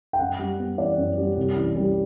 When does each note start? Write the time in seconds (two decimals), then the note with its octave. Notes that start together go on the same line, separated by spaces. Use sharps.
0.13 G5
0.19 F#2 F#5
0.39 G3
0.59 B3
0.78 E3 D5
0.98 F#2
1.18 G3
1.37 C2
1.56 E3
1.76 G3